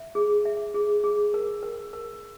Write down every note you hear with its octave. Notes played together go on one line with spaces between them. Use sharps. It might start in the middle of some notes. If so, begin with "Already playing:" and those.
Already playing: E5
G#4
E5
G#4
G#4
A#4
A#4
A#4